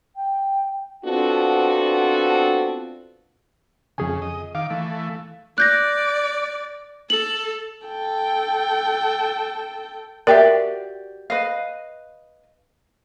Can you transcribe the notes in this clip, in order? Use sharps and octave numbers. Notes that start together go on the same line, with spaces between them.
G5
B3 C4 D4 F4 F#4 A4
F2 C#3 G#4 G#5
D#5
D#3 F5 D6
E3 A3
D5 F#6 G6 A#6
A4 F#7
A4 G5
F#4 G4 A#4 D5 E5
B4 D#5 F5